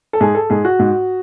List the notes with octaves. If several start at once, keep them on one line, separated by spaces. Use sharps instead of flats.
A4
G#2 G#4
A4
G#2 G#4
F#4
G#2